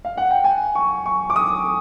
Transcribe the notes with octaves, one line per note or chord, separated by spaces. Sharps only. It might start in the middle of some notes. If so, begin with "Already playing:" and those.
F5
F#5
G5
G#5
C#6
C#6
D6
D#6